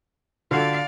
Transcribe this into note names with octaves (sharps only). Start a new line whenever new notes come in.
D3 F4 F#4 A4 D5 F5